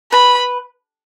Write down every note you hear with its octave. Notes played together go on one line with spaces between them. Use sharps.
B4 B5